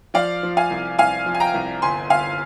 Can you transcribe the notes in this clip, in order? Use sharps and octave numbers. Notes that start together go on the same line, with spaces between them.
F3 D5 F5
F3
F5 G#5
C2
C2 F5 G#5
F3
G#5
G5 A#5
C2
G1 G#5 C6
G1 F5 G#5